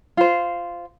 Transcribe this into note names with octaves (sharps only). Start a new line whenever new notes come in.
F4 C5